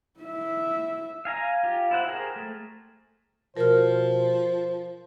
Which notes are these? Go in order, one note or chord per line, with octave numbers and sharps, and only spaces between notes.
E4 E5
F5 G#5 A#5
F4 G4
E4 C5 F#5
G4 G#4 A#4 C5
A3
B2 F3 A#4 C5 F6